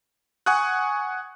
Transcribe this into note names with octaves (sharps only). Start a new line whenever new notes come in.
F#5 G#5 C#6 D#6 F#6